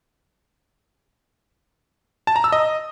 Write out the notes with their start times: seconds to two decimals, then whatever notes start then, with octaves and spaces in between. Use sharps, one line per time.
2.27 A5
2.36 A#5
2.44 E6
2.52 D#5